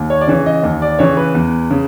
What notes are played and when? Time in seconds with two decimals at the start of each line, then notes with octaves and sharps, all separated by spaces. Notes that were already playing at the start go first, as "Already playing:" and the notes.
Already playing: D#2
0.10 C#5
0.21 D5
0.28 C#3 E3 C#5
0.46 D#5
0.63 D#2
0.82 D5
0.99 C#3 E3 C#5
1.17 B4
1.35 E2
1.70 C#3